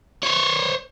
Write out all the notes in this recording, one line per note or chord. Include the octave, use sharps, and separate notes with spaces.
C5 C#5